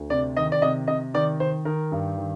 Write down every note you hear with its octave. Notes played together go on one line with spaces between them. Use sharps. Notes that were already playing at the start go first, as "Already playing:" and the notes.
Already playing: D2
C3 D5
D#3 D#5
D5
C3 D#5
C3 D#5
D#3 D5
D#3 C5
D#3 A#4
G2
D#3